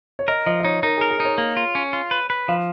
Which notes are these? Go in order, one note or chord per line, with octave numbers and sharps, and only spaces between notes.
C#5
A#4 D#5
F3 D#5
D#5
D#4 C#5
D#4 A#4
G#4 A#4
G#4
D#4
C#5
A#3
F4
C#4
F4
B4
B4
F3 F5